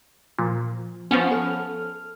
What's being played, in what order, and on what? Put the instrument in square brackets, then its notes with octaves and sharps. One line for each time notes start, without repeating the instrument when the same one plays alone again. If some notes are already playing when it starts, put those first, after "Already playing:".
[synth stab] A#2 [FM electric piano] F3
[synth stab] F3 B3 C#4
[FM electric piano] A4 F6